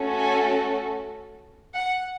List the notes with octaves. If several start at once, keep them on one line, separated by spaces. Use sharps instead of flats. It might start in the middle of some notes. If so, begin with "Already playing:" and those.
Already playing: A3 C#4 F#4 A4
G#5
F#5